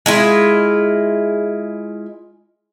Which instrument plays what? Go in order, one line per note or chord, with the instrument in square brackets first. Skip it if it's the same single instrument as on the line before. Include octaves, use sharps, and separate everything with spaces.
[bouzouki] G#3 E4 F4